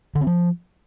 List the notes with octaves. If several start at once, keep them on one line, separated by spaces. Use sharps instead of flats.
D3
C4
F3